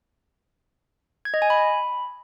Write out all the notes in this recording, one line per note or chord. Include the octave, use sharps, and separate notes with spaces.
G#6
D#5
G#5
B5